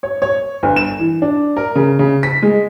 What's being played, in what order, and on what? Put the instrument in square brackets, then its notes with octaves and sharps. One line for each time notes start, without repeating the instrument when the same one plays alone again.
[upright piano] C#5
C#5
G1
E7
E3
D4
A#4
C#3
C#3
B6
G#3